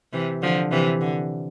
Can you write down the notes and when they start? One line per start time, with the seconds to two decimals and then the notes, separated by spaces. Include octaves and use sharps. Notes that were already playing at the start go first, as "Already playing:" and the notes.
0.13 C3 E3
0.42 D3 F3
0.71 C3 E3
1.01 D3